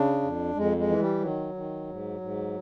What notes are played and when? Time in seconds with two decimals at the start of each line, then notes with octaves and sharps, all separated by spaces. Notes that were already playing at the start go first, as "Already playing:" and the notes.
Already playing: C#3 D4
0.22 F2
0.55 F2 G#3
0.77 G#3
0.87 E3
0.99 G3
1.20 D#3 F#3
1.54 D#3
1.87 G#2
2.20 G#2